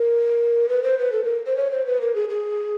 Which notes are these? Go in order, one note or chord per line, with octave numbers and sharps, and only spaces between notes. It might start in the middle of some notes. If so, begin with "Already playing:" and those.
Already playing: A#4
B4
C5
B4
A4
A#4
C5
C#5
C5
B4
A#4
G#4
G#4